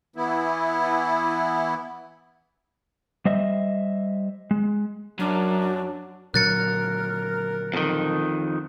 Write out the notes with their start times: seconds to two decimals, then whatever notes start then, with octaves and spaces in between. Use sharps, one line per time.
0.16 E3 B3 E4
3.25 G3 C5 D#5 E5
4.51 G#3
5.19 F#2 F#3 D4
6.34 A#2 D3 F#3 A#4 F#6 A6 C#7
7.74 F2 D#3